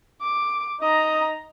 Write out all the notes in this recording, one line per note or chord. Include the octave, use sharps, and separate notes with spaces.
D6
D#4 D#5 A#5